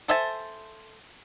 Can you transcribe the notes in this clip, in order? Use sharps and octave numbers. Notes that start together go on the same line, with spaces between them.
A4 C5 E5 G#5 A5